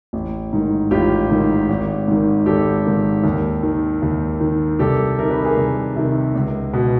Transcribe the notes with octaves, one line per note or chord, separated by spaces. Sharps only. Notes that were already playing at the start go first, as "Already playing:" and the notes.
A1
G#2 D#3
A1 F4 G4
G#2 D#3
G#1
G#2 D#3
G#1 G4 A4
G#2 D#3
D#2
D#3
D#2
D#3
C2 G4 A4
C3 D#3 A#4
B4
G#4 A#4
C2
C3 D#3
C#2
B2